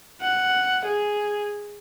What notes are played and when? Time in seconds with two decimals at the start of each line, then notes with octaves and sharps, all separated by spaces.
0.21 F#5
0.86 G#4